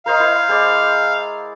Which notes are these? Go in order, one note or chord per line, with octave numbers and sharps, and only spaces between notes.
A#4 C5 D#5 F5
E4
G#3 C5 D5